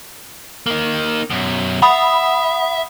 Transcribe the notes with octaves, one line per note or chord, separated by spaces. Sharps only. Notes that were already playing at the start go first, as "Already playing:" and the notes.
A#3 D#4
F#2 B2
E5 F#5 B5 D#6